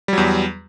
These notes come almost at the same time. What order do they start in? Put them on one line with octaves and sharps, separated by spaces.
G3 F#3 E2